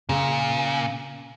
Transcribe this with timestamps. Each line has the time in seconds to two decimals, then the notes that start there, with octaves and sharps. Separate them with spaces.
0.09 A#2 C#3